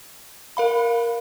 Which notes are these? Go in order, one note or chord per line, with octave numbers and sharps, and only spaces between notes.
A#4 F5 B5